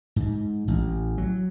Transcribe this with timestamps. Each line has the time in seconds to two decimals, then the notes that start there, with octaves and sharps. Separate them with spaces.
0.16 G#2
0.68 A1
1.18 F#3